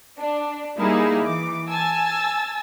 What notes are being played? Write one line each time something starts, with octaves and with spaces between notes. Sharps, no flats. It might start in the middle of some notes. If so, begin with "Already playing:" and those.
D4
G3 A#3 D#4 E4 G#4
E3 D6
G#5 A5 E6 A6